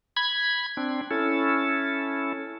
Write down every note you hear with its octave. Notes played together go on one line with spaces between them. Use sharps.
B5 G#6
C4 D4
C#4 E4 A4